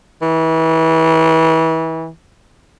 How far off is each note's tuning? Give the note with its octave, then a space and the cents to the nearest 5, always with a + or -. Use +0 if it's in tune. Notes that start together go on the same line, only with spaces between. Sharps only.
E3 -30